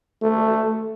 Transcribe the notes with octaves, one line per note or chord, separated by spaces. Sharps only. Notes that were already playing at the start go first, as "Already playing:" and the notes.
A3